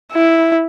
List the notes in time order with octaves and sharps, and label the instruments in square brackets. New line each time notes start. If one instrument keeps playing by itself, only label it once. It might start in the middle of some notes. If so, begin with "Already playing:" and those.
[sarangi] E4